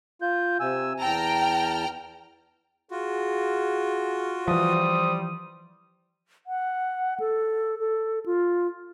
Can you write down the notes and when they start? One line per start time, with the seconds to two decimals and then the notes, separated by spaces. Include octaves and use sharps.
0.22 F4 G6
0.60 C3 G#5 E6
1.00 E2 G5 A5 A#5 F6
2.91 F4 F#4 G#4
4.48 E3 F3 G3 C5 D#6
6.47 F#5
7.20 A4
7.79 A4
8.26 F4